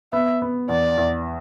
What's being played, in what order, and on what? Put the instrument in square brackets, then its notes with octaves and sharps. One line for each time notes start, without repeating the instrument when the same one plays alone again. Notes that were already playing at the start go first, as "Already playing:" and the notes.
[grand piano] B3 [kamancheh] E5
[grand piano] B3
[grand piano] E2 [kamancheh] D5
[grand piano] E2